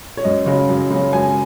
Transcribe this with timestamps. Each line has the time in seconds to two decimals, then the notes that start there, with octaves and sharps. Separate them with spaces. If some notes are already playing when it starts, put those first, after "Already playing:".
0.17 C#5
0.24 F#2 D#5
0.46 C#3 F#3 C#4
0.69 F#2
0.90 C#3 F#3 C#4
1.13 F#2 G#5